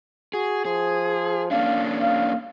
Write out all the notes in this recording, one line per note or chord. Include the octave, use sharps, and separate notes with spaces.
F#4 G#4
F3 G#4
A#3 C#4 D4 F5
F5